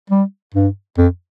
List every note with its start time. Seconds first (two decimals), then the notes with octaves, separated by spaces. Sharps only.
0.10 G3
0.54 G2
0.98 F2